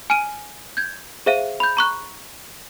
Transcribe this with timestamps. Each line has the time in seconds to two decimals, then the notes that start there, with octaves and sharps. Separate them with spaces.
0.10 G#5 F6 D7 D#7
0.77 G6 G#6
1.26 G#4 C5 E5 F5 D#7
1.60 B5 G6
1.77 A#5 C#6 F#6